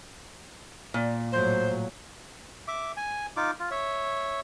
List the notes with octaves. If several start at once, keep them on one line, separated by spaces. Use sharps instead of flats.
A#2
A2 F#3 C5
E5 D6
G#5
D#4 F4 D6
F4
C#5 E5